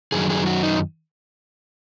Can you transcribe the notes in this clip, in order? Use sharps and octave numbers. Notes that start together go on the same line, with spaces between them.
F#2 D#3 F#3 G#4
G#4
F#4
D#4